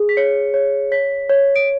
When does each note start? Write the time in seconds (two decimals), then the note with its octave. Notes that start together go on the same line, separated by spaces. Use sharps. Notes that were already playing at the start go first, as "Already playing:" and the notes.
Already playing: G#4
0.09 B6
0.17 C#5 C#7
0.54 C#5
0.92 C#5 B6
1.30 C#5
1.56 D7